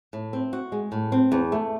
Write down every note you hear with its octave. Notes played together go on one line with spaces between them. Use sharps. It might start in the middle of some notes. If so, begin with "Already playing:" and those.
A2
C4
F#4
G#3
A2
C4
E2
A3